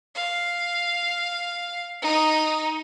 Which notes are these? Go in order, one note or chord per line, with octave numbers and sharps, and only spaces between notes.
F5
D#4